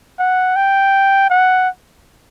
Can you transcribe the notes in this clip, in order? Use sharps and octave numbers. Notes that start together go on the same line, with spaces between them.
F#5
G5
F#5